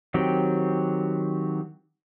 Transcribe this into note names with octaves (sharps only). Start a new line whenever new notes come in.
D#3 F#3 C4 G4